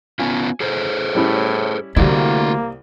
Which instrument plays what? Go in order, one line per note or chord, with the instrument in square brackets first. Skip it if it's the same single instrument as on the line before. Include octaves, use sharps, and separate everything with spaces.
[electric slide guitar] B3 C#4 F4 [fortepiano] G#5
[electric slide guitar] G#4 A4 C5
[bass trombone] A2 [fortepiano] G3 C#4 E4
[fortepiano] C2 G3 [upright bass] D3 A3 [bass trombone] A#3 [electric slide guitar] E4 F#4